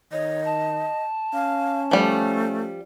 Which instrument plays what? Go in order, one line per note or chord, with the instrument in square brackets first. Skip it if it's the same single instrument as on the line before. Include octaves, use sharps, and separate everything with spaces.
[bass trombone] D#3 [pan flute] C#5 [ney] D#5
[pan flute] A5
[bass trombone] C#4 [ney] F5
[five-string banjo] F3 G3 [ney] A3